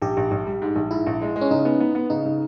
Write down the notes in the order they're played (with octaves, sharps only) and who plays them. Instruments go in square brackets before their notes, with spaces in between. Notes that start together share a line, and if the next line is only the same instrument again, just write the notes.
[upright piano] A#1 [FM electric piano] G4
[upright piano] A#1
A#1
G3
G#2
A#1
[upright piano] G#2 [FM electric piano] E4
[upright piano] A#1
G#3
G#3
[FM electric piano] C#4
[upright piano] C#3 [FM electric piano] D#4
[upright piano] B3
B3
B3
[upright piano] C#3 [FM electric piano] D#4
[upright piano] C#3